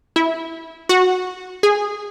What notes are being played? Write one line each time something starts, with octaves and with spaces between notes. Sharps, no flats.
E4
F#4
G#4